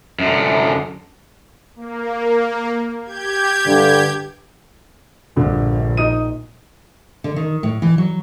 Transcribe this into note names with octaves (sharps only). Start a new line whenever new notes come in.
F#2 D3
A#3
G4 G6 G#6
G2 D3
A#1 G2 D3
D#4 D#6 D#7
D3
D#3
A2
E3
F#3